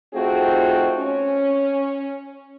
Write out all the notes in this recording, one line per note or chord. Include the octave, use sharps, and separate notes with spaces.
A3 C4 D#4 F4 F#4 G#4
C#4